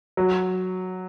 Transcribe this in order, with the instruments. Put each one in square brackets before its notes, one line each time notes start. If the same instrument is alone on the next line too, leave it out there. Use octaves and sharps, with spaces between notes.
[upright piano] F#3